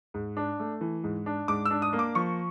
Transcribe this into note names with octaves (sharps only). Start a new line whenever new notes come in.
G#2
D4
A3
E3
G#2
D4
G#2 D6
E6
D4
D#6
A#3
D6
F3 C#6